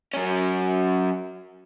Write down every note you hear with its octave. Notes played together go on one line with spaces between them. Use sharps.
F#3 C#4